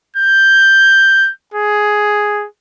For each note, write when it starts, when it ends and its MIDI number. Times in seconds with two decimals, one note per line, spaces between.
0.17 1.31 91
1.54 2.47 68